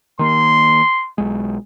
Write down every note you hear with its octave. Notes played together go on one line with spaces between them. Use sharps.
D#3 A#3 C6
B1 G#3